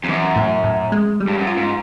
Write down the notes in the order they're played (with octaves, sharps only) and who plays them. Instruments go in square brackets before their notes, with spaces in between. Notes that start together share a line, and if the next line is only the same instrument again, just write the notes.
[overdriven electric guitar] F2
[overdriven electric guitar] F#2 [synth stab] E3
[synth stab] A2
A2
G#3
G3
[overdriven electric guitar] G2
F#2
[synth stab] F4
[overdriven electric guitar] G#2